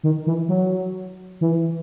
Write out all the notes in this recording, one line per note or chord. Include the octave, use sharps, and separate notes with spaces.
D#3
E3
F#3
E3